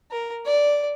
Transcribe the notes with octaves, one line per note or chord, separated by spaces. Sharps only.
A#4
D5